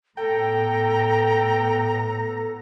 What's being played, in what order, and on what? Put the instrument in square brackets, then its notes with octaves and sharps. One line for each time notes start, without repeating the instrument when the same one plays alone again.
[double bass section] A2 B3 [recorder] A4 [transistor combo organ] G5 [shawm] A#5